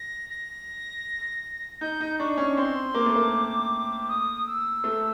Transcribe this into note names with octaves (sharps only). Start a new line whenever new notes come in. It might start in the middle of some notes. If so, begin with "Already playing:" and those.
Already playing: A#6
A#6
D#4 G6
D#4
D4 C#6
C#4
C4 C6
A#3 D6
A3
A#3
D#6
E6
A3